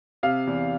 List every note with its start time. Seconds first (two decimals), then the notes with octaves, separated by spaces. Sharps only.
0.23 C3 F5
0.47 E2